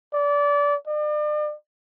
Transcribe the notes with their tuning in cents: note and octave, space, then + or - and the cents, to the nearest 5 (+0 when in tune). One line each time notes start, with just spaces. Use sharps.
D5 -25
D5 +40